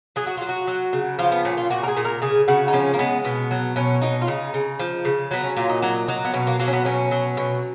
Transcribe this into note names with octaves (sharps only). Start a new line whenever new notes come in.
F#3 G#4
F#4
F#3 F4
F#4
F#3
C#3
F3 F4
B3
A#2 C#4
F4
A#2 F#4
A#4
G#4
A#2
A#4
C#3 G#4
C#3 F#4
D#4
F3 C#4
A#3
G#3 B3
B2 B3
F#3
B2 C#4
B2 D#4
F4
C#3 D#4
C#3
F3
C#3
F#3 B3
C#4
A#2 F4
D#4
F#3 D#4
F#3 D#4
B3
B2 C#4
A#3
F#3 A#3
C#4
B3
B2 C#4
F#3
B2